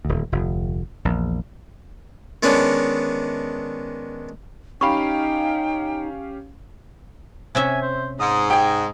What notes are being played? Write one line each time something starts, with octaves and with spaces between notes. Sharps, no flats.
D#1 D2
F1 D2
A#1 E2
D#3 G#3 B3 C#4 D4
C#4 D#4 G4 F5 G5 B5 C#6
C3 C#4 E5 G#5
C5
G#2 D#6
D#5 G5 G#5